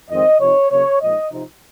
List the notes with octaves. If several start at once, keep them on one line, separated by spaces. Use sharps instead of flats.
F2 D#3 G#3 C4 D#5
C3 F3 C4 D#4 C#5
C#3 F#3 A#3 C#5
A#2 F3 G#3 D#4 D#5
C3 F3 C4 D#4